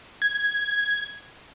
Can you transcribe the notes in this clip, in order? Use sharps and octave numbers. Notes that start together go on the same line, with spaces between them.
G#6